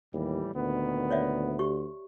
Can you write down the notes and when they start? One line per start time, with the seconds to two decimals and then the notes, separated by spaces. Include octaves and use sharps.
0.13 D#2 A2 E3 G3
0.55 D2 A#2 D#3 B3
1.10 C#5 D5 E5
1.59 G4 C#6